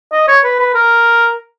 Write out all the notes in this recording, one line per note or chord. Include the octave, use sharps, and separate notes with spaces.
D#5
C#5
B4
B4
A#4